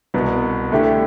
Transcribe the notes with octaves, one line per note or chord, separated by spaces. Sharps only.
C2 B2 B3
D3 A3 E4 G4